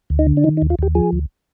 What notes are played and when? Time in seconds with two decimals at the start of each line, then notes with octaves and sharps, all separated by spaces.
0.10 D2
0.19 D#4
0.27 D3
0.37 D4
0.44 D#3 D#4
0.57 D#4
0.62 D#2
0.70 F4
0.79 D#2 G4
0.95 F3 G#4
1.12 D2